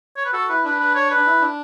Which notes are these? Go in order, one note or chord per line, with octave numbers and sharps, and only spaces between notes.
C#5
B4
F#4 A4
E4 B4
D4 B4
B4
C#5
B4
D4
E4
D4